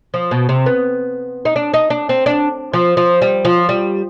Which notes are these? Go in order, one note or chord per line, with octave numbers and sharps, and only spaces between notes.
F3
B2
C3
B3
D#4
D4
D#4
D4
C4
D4
F3
F3
G3
F3
G3